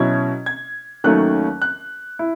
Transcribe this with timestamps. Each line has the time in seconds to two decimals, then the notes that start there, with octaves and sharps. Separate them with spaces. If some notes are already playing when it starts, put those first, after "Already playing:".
Already playing: B2 F#3 C#4 E4 G#6
0.46 G#6
1.04 D#2 D#3 F#3 A3 C#4 F#6
1.62 F#6
2.19 E4